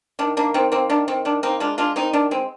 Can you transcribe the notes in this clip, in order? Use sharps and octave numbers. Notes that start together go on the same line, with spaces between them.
D#3 D4
A#3 D4
D#3 C4
A#3 C4
D#3 D4
D#3 C4
D#3 D4
A#3 C4 D#4
G#3 D4 F4
G#3 D4 F4
D#3 C4 D#4
D#3 D4
G#3 C4